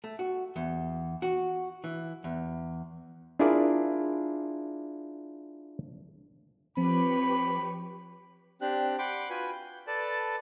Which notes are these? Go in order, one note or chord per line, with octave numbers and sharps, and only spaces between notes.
A3
F#4
E2
F#4
E3
E2
D4 E4 F4 G#4 A#4 D5
F3 C4 G4 B4 C#5 B5
C4 D4 G4 F#6
F#5 G5 B5 C6 D6
F4 F#4 B4 G5 G#5 B5
G6
A4 B4 D5 A5